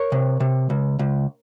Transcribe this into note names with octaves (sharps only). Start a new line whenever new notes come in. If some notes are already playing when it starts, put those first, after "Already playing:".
Already playing: A#4 C#5
C3
C3
C#2
C#2